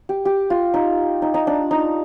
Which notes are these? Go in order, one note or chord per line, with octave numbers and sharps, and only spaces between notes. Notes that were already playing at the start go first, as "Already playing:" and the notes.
G4
G4
F4
D#4
D#4
D#4
D4
D#4